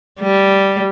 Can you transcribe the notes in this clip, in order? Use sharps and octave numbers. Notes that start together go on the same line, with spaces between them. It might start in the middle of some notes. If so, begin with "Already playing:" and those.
G3